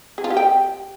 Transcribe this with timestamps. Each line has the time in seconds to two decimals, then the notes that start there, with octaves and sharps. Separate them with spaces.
0.18 G#4
0.24 F4
0.30 G4
0.37 G5